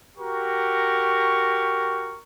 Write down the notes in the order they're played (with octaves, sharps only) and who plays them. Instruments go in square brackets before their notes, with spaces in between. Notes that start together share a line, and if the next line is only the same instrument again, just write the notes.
[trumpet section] F#4 G4 A#4 C#6